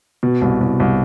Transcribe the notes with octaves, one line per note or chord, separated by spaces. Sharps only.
B2
C2
C2
C2